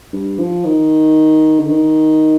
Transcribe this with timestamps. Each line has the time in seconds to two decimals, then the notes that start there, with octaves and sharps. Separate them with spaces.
0.13 G2
0.39 F3
0.65 D#3
1.60 D3
1.70 D#3